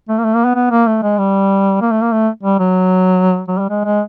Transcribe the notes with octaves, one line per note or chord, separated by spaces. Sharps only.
A3
A#3
A3
A#3
B3
B3
A#3
A3
G#3
G3
A#3
A3
A#3
A3
G3
F#3
F#3
G3
G#3
G#3